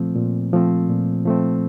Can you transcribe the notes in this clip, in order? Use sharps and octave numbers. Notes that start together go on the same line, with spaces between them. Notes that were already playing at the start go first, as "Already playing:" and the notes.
Already playing: A#2 F3 A3 C4
A#2
F3 A3 C4
A#2
F3 A3 C4